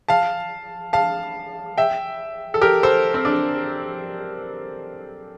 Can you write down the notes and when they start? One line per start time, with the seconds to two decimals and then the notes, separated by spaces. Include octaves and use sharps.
0.09 F5 A5
0.93 F5 A5
1.78 E5 G5
2.54 A4
2.61 G4 A#4
2.83 A4 C5
3.14 C4
3.25 D4